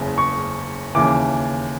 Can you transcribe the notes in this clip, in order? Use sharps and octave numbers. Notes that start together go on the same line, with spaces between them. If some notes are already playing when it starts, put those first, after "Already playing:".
Already playing: F#1 E2 C#3
C#6
D#2 C#3 E3 D6